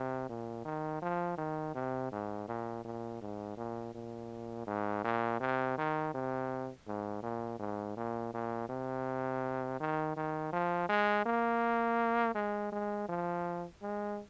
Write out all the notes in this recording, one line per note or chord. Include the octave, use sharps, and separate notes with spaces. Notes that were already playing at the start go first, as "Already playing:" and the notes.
Already playing: C3
A#2
D#3
F3
D#3
C3
G#2
A#2
A#2
G#2
A#2
A#2
G#2
A#2
C3
D#3
C3
G#2
A#2
G#2
A#2
A#2
C3
D#3
D#3
F3
G#3
A#3
G#3
G#3
F3
G#3